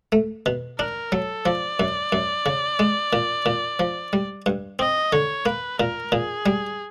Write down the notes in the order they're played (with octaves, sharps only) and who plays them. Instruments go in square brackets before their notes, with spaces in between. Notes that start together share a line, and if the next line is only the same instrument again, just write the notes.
[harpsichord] A3
B2
[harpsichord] D4 [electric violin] A#4
[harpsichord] F#3 [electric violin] A4
[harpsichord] F3 [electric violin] D5
[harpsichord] F#2
F#2
C#3
G#3
A#2
A#2
F3
G3
G2
[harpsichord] C4 [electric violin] D#5
[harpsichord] D3 [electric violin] C#5
[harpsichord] A#3 [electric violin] B4
[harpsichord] A#2 [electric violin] A#4
[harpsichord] A#2 [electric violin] G#4
[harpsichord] G3